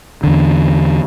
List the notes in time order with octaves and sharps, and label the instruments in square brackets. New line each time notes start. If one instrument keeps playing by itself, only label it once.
[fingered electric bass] E2 D3